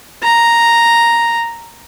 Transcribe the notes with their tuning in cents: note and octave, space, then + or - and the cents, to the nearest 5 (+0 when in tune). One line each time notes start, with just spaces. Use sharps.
A#5 +0